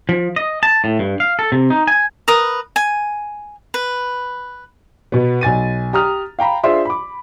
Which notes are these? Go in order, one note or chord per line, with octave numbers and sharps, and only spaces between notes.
F3
D#5
A5
A2
G2
F5
A4
C3
D#4
G#5
A#4 B4 D#6
G#5
B4
B2 B3
B1 G#5 A6 D#7
G4 A#5 D#6 F6
F5 G5 A#5 B5
D4 F4 G#4 C5 E5 C6
B5 D6